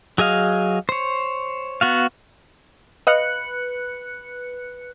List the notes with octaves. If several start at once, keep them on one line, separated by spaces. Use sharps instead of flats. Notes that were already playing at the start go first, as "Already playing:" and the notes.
F#3 G#4 D#5 F5
C5 C#5
B3 F#4 F5
B4 D#5 F5 F#6 C#7